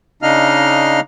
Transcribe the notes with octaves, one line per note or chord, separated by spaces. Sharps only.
C#3 D4 D#4 D#5 F5 F6